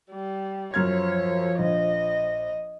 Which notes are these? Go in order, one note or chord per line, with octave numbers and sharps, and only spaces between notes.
G3
F#2 F3 C#5 F6 G#6
A#1 D#5